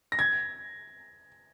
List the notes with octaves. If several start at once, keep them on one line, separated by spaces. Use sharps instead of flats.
A#6
G#6